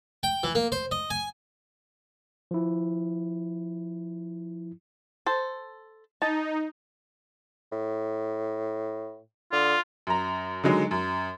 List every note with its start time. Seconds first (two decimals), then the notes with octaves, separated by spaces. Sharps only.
0.23 G5
0.43 E3
0.55 A#3
0.72 C5
0.91 D#5
1.10 G#5
2.51 F3 E4
5.26 A4 C5
6.22 D#4 A5
7.72 A2
9.52 D3 F4
10.07 F#2 A#5
10.64 D3 D#3 F#3 G#3
10.91 F#2